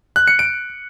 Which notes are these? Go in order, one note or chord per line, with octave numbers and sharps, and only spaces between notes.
F#6
C#7
D7